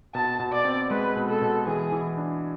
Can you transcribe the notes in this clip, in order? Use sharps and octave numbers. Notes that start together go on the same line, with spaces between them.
B2 A5
B2
D5
C4
G#3 B4
B2
A4
B2
E3 G#4
E3
D4